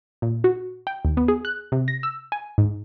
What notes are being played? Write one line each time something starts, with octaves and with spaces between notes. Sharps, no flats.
A#2
F#4
G5
D#2
B3
G#4
F#6
C3
A#6
E6
G#5
G#2